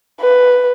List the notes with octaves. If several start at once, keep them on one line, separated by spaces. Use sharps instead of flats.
B4